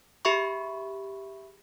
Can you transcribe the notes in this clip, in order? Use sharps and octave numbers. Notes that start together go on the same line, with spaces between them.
G4 G#4 E5 B5 C#6